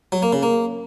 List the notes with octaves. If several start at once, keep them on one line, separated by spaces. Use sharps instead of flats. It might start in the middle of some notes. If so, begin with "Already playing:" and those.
F#3
A#3
C#3
A#3